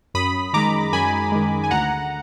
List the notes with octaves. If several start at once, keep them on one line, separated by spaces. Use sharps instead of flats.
F#2 B5 D#6
D#3 G#3 A#5 D6
F#2 G#5 B5
D#3 G#3
G#5
D2 F#5 A#5